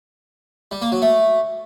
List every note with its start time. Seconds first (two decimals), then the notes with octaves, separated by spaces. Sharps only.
0.71 G3
0.82 A#3
0.92 F#3
1.02 A3